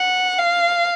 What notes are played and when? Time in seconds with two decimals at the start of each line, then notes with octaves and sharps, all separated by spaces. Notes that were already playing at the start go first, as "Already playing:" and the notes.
Already playing: F#5
0.39 F5